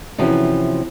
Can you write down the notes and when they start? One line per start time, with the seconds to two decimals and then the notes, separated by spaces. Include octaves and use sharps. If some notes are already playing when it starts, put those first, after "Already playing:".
0.18 C3 E3 F3 C#4 F#4 G#4